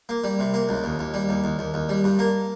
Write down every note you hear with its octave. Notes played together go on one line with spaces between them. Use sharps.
A#3
G3
C3
A#3
C#2
D#2
D#2
G3
D#2
D#2
D#2
D#2
G3
G2
A#3